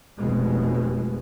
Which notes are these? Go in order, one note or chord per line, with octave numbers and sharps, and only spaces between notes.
F1 B2 G#3